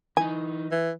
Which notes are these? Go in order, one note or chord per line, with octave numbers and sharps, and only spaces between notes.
E3 D#4 G#5
E3